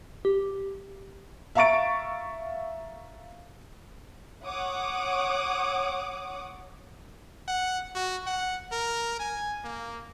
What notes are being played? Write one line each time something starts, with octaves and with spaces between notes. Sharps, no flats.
G4
E5 F5 A#5 C#6 A6 D7
C#5 F#5 D6 D#6
F#5
F#4
F#5
A#4
G#5
A#3